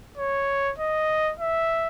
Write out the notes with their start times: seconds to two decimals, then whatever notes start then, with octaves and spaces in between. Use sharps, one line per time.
0.17 C#5
0.78 D#5
1.40 E5